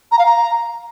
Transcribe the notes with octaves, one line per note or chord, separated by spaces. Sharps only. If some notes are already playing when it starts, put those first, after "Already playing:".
A#5
F5
A#5